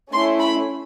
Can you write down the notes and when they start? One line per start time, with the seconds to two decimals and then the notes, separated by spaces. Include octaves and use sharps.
0.12 A3 C#4 E4 C6
0.40 B5